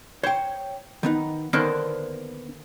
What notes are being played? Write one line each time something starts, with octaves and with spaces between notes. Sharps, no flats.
C5 C#5 G5
D#3 B3 D#4
D3 D#3 A#3 B3 D4 C5